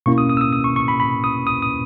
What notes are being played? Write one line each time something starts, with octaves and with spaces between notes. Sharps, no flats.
B2 A#3 C#4 E4 C#6
D#6
D#6
E6
D#6
D#6
C#6
C#6
B5
B5
D#6
D#6
D#6